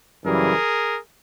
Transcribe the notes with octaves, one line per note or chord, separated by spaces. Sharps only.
F#2 C#3 E3 G3 G#4 A#4